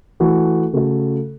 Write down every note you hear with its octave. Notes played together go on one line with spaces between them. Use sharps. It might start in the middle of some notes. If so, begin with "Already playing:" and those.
E3 A3 F#4 A4
C#3 A3 F#4 A4